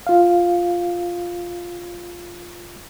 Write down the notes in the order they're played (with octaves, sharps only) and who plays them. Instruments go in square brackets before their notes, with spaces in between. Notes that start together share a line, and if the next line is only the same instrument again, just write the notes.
[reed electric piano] F4 F5